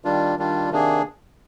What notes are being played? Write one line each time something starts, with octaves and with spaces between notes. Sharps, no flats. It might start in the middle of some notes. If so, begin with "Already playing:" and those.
D#3 G3 D4 F4
D#3 G3 D4 F4
C3 D#3 A#3 D4 G#4